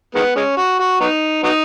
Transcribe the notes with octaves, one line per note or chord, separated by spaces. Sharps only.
D#3 G#3 B3
G#3 C#4
F#4
F#4
F#3 B3 D#4
F#3 B3 D#4